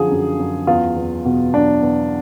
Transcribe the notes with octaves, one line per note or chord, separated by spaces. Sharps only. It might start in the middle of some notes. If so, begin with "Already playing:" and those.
Already playing: F#2 D3 F3 G#4
F#2
F#2
E2 F4
E2
B2
F#3 D4
E2